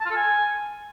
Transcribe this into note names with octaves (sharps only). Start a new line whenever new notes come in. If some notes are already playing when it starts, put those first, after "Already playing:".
A5
F4
A4
G#5